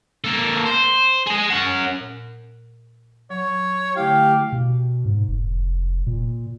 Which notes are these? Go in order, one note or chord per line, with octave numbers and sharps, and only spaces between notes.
A#3 A4
C5
G#4 D#5
C#4 F#5
A#2
F#3 C#5
D3 A3 E4 G4 F5 G5
B2
G#2
F1
A#2